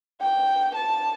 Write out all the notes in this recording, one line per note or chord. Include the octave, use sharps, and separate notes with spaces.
G5
A5